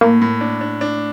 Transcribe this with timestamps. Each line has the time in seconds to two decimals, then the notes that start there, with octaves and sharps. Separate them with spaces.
0.01 A2 A#3
0.22 A2
0.41 D4
0.61 D4
0.81 D4